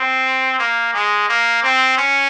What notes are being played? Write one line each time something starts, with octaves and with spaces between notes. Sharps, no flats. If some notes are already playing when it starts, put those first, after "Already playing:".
Already playing: C4
A#3
G#3
A#3
C4
C#4